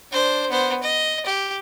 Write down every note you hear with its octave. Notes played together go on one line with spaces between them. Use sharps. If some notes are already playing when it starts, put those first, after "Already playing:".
D4 C5
B3 C5
D#5
G4